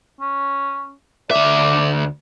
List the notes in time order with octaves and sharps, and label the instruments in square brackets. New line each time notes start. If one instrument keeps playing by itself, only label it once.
[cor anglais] C#4
[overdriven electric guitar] D2 E5 [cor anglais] D5